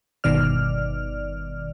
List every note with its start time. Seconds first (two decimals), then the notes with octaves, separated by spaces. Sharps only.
0.24 G1 B2 D#3 D5 F6